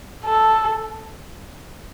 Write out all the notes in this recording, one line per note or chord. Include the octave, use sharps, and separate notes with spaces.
A4